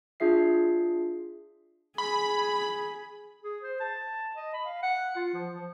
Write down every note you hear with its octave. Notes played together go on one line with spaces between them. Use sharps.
D4 F4 G#4 E5 C7
G#4 B5
G#4
C5
A5
D#5
B5
F5
F#5
F4
F3
F3